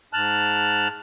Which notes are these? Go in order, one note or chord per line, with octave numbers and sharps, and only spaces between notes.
G#2 A5 F6 F#6